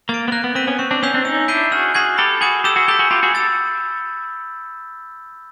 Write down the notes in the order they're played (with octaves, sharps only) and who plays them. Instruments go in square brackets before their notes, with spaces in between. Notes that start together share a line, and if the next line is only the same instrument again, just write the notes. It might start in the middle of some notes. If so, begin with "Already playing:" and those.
[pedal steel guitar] A#3 [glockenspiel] A6 D7
[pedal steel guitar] B3
[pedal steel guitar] A#3 [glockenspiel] F#6
[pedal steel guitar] B3
[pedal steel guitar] C4 [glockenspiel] B6 D#7
[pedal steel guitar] B3 C#4
[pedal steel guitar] C4 [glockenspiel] C#6
[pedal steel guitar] C4 D4
[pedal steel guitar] B3 C#4 [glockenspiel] E6 G6 C7 F7
[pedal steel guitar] C4 D4
[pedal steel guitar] C#4 D#4 [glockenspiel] E6
[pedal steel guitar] D4 E4 [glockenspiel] G6 C7 D#7 G7
[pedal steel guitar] F#4 G#4 [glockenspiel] F6
[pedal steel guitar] F#4 G#4 [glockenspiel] G#6 C7
[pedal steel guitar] G4 A4 [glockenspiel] B5
[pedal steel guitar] F#4 G#4 [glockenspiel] D#6 G#6
[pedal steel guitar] G4 A4 [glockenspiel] E6
[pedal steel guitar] F#4 G#4
[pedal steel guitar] G4 A4 [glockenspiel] G6 B6
[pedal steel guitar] F#4 G#4
[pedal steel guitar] F4 G4 [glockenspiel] B5
[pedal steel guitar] F#4 G#4
[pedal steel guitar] G4 A4 [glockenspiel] E6 A6